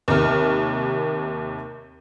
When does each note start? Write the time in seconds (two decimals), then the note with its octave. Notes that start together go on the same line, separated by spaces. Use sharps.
0.08 D#2 C3 A#4 F6